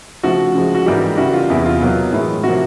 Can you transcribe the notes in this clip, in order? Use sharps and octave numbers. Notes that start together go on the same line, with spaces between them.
C#3 F3 A3 F#4
C#3 F3 G#3
F#4
G#2 E3 G3 A#3 G4
C#3 E3 G3 F#4
F4
E2 C3 E3 E4
F4
B2 F#3 A#3
A2 E3 G#3
C3 F3 A#3 F#4